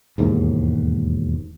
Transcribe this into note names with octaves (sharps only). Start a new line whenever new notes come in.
E1 D#2 G#2